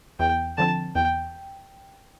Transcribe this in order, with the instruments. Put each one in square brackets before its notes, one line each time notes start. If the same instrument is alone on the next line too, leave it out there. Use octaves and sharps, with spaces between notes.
[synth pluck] E2 [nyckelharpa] G5
[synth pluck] D3 F3 C4 [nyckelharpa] A5
[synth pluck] E2 [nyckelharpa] G5